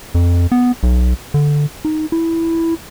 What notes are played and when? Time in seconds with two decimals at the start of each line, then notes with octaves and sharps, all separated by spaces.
0.15 F2
0.52 B3
0.83 B1
1.34 D3
1.85 D#4
2.12 E4